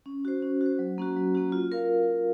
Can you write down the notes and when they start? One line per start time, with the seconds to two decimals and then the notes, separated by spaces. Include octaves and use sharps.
0.06 C#4
0.25 F#4 C5
0.42 C#4
0.61 F#4 C5
0.79 F#3
0.98 A#3 C#4 F#4
1.17 F#3
1.35 A#3 C#4 F#4
1.52 F4
1.72 A#4 F5